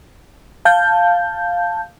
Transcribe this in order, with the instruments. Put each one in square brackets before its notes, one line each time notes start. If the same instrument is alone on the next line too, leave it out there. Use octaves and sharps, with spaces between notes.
[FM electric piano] F5 A5 G6